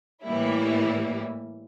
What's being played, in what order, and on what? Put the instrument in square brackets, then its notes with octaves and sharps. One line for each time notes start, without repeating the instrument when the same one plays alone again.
[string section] A2 E3 G3 A#3 E4